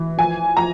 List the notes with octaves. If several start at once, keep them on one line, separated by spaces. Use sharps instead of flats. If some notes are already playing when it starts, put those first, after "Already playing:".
Already playing: E3
F3 G#5
F3 A#5